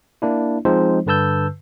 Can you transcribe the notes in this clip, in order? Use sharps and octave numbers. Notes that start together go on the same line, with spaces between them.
A#3 D4 E4
F3 G#3 C4 D#4 C5
G2 D3 B4 A5 E6 G6